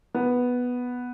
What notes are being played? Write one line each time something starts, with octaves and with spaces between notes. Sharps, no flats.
B3